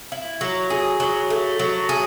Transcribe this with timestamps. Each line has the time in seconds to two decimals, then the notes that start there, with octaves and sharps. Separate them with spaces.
0.12 E4
0.41 F#3
0.70 G#4
1.00 F#3
1.30 A3
1.60 F#3
1.89 G#4